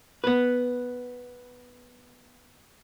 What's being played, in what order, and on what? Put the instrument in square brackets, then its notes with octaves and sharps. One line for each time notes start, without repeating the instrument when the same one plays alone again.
[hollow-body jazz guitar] B3 B4